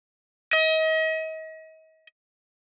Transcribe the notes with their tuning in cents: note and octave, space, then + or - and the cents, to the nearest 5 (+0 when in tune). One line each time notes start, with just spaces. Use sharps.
D#5 +35